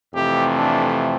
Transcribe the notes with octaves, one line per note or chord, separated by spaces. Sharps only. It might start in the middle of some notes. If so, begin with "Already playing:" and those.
F2 C3 E3 A3 C4 G4
D4